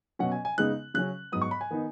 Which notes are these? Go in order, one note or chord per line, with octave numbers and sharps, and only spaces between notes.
B2 F#3 C#4 F#5
G#5
G#5
C#3 G#3 B3 D#4 F#6
C#3 F#3 C#4 F#6
G#2 F#3 B3 D#6
C#6
B5
G#5
D#3 B3 D#4